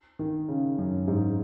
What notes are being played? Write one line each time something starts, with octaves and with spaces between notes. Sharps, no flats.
D#3
C#3
F#2
G#2